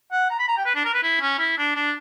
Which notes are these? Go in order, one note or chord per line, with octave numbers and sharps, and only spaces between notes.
F#5
A#5
B5
A#5
G5
B4
D4
A#4
B4
E4
C#4
E4
D4
D4